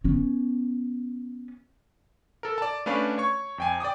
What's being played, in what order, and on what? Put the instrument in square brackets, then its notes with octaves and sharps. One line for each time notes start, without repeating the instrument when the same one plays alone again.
[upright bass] B3 C#4
[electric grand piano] A4 A#4
D5 A5
A3 C#4 D4 B4 D5 F5
C#5 C#6
F2 G5 G#5
D5 G5 D6 D#6